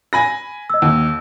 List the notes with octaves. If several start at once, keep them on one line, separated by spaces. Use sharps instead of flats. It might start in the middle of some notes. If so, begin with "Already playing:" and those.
G#5 B5 A#6
D#5 E6
D#2